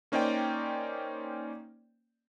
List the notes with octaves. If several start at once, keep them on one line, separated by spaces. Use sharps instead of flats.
A#3 C#4 D#4 C5 D5 G5